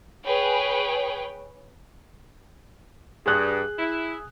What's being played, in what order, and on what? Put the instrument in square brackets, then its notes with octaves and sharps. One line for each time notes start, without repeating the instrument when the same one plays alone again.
[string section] G#4 B4 C#5 G5
[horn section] G2 [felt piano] G#4 F#6
[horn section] E4